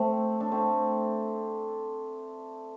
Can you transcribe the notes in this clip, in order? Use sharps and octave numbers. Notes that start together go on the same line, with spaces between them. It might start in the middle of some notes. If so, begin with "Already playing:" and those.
Already playing: A3 C4
D4
A3 C4